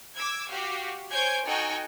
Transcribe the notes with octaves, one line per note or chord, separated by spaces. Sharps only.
D6 E6 G#6
F#4 G4 F5
C5 C#5 G#5 G6 G#6 D7
D#4 F#4 A4 G5 G#5